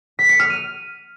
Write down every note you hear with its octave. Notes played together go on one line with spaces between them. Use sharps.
B6
C#7
F6
D#7